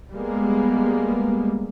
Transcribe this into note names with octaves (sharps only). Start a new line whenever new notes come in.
G3 G#3 A#3 B3